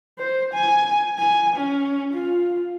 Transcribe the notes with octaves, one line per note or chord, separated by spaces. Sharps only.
C5
G#5
G#5
C#4
F4